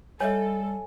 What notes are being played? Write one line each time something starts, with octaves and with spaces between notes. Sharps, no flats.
G3 A4 C#5 D#5 E5 G#5